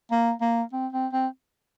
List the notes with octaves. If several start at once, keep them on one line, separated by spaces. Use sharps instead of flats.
A#3
A#3
C4
C4
C4